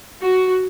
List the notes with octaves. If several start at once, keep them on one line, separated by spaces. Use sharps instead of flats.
F#4